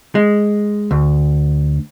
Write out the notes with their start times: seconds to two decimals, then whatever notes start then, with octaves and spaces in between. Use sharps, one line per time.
0.15 G#3
0.91 D2